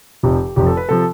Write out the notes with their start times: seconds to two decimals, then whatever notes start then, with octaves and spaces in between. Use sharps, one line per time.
0.23 F1 F2 C3 F3 G4
0.56 F1 F2 C3 F3 G4
0.66 A4
0.77 B4
0.89 C3 F3 A4